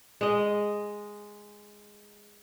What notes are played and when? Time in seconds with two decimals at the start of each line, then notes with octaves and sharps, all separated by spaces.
0.21 G#3 D#5